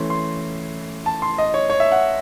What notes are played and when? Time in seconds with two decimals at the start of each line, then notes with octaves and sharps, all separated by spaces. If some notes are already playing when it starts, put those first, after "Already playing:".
Already playing: E3 A3 C#4 C6
0.10 C6
1.06 A5
1.22 C6
1.38 D#5
1.54 C#5
1.70 C#5
1.80 E5
1.92 F#5